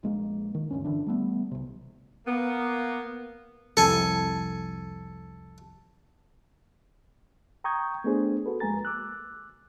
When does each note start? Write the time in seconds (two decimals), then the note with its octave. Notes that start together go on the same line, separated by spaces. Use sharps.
0.03 A#1 G#3 A#3
0.54 D#3
0.71 F#1 D2 G2 C#4
0.84 G1 D3 E3 D4
1.07 G3 A3 B3
1.51 B1 C3
2.26 A#3 B3
3.77 C2 F2 A4 G#5
7.64 G5 A#5 C#6 D#6 G6 G#6
8.04 A3 B3 D4 G#4 C5
8.46 F#4 A4 B4
8.60 F2 G#3 A#3 G#5 A#5 A6
8.85 D6 E6 F#6